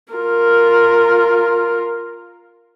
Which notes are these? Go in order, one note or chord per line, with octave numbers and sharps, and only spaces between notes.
F4 A#4